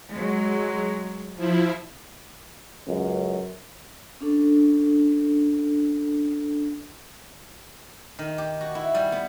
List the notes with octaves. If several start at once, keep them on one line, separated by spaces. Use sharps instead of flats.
F#3 G#3
F3 E4
C#2 F#2
C#4 D4 A4
D#3
G4
F#4
E4
G3
B3